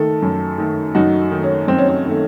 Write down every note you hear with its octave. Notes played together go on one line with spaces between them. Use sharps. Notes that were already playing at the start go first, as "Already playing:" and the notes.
Already playing: D#3 A3 A4
F#2
D#3 A3
F#2 D#4 F#4
D#3 A3
C#4
F#2 C4
C#4
C4
D#3 A3